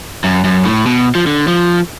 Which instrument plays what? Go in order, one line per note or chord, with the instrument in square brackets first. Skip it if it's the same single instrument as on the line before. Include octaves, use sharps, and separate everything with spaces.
[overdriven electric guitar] F#2
F#2
A2
B2
F3
D3
F3